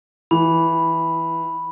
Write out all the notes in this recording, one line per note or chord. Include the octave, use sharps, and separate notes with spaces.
E3 B5